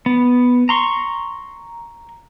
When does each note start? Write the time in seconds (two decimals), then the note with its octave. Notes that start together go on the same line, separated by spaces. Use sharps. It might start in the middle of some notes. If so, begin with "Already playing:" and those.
0.06 B3
0.69 A#5 C6 C#6